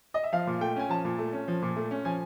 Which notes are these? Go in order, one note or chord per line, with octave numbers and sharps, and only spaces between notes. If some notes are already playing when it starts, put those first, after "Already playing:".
D#5
E5
F3 F5
A#2
A3 G5
C#4 G#5
F3 A5
A#2
A3
C#4
F3
A#2
A3
C#4
F3 G#5